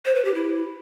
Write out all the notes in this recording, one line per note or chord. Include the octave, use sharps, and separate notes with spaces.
C5
B4
G4
E4